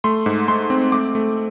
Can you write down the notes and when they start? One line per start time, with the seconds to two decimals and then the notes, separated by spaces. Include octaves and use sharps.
0.04 A3 C6
0.26 G#2
0.48 A3 C6
0.70 C4
0.92 A3 D6
1.15 A3